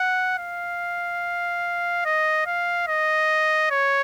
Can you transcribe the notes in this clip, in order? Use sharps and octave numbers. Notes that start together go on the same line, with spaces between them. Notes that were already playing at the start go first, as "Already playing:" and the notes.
Already playing: F#5
F5
D#5
F5
D#5
C#5